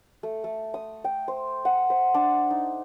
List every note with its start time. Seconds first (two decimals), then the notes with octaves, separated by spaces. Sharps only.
0.23 A3
0.44 A3
0.74 D#6
1.04 G5
1.28 C5
1.65 F#5
1.90 C5
2.14 D4
2.50 D#4